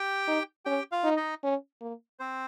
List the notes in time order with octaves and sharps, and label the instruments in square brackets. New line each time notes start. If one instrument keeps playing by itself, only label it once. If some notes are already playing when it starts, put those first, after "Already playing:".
Already playing: [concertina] G4 G5
[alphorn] D#4
[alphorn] C#4 [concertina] G4 G5
[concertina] F4 F5
[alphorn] D#4
[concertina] D#4 D#5
[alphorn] C#4
A#3
[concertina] C4 C5